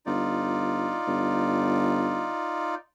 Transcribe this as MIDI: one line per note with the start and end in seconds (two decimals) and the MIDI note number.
0.06 0.97 31
0.06 2.75 63
0.06 2.75 65
0.06 2.75 74
1.07 2.30 31